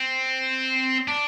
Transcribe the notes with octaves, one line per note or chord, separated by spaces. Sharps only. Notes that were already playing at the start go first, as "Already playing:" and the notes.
Already playing: C4
D4